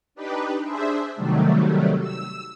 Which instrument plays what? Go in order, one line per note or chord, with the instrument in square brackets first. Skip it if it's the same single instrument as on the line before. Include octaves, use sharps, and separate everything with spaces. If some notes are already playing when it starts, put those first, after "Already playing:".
[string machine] D4 D#4 G4 B4
D4 G#4 C5 E5
C3 D#3 F#3 G3 A3
E6